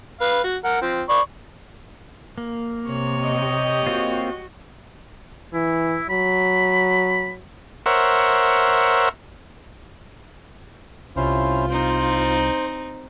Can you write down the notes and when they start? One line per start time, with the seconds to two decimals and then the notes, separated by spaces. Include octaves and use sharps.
0.21 B4 F5
0.44 F#4
0.64 A#4 F#5
0.82 F3 C4
1.09 D5 B5 C#6
2.38 A#3
2.89 C3 C#5
3.23 G4 D#5
3.86 A#3 C4 F4 F#4
5.54 E3 E4
6.10 F#3 B5
7.86 A#4 C5 C#5 E5 F#5
11.16 C2 C#4 E4 F4 C5
11.69 C4 D#4 C5